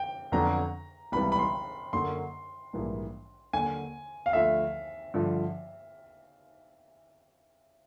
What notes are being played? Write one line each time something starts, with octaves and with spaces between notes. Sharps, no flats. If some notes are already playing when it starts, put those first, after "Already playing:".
Already playing: G5
F2 D3 F#3 B3 D4 A#5
C#2 C3 E3 G3 B3 B5
B5
C6
F#2 D3 F#3 A#3 C6
A#1 G#2 E3 G3 A#3
D#2 D3 F#3 G#5
F5
D2 D3 F3 A3 E5
G2 D3 F3